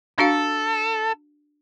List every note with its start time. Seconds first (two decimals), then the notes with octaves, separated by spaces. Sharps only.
0.19 D4 F#4 A4 F5